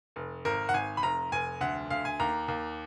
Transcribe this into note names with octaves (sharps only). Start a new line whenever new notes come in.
F1
G#1 A#4
F#5
G#1 G#5
B5
F1 A#5
F1 G#5
D2 F#5
D2 F5
G#5
D#2 A#5
D#2